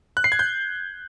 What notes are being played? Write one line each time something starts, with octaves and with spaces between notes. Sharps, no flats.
F#6
C7
G#6
G6